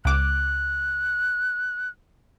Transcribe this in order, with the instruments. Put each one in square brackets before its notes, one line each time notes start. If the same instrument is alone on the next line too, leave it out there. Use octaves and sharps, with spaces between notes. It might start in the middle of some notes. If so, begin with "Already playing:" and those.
[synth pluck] C#2 D6 [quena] F#6